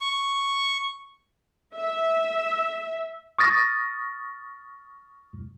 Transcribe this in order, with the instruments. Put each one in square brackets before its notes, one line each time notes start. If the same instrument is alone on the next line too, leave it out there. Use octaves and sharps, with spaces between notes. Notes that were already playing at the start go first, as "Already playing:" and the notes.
[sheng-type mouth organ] C#6
[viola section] E5
[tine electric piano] C#6 D#6 F6 A6 A#6